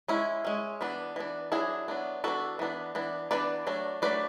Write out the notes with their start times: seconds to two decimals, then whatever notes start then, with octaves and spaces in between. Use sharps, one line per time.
0.08 G#3 C#4 E4
0.45 G#3 C#4
0.81 E3 B3 D4
1.16 E3 B3 D4
1.52 F#3 B3 D4 E4 G#4
1.88 F#3 B3 D4
2.24 E3 B3 D4 F#4 A4
2.59 E3 B3 D4
2.95 E3 B3 D4
3.31 E3 B3 D4 B4 D5
3.67 F#3 A3 D4
4.02 F#3 A3 D4 B4 D5